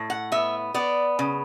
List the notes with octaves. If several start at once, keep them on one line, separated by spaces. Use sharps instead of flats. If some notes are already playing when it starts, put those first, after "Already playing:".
Already playing: A2
F#5
B3 E5
B3 D5
C#3